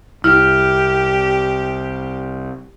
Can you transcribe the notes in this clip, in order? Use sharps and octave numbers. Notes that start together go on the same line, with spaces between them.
C2 E4 G4 F6